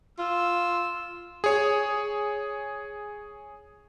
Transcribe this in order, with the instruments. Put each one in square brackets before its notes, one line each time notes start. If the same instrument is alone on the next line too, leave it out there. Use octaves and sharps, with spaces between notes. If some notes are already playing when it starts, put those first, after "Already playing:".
[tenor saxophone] F4 [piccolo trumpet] E6
[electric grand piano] G#4 C#5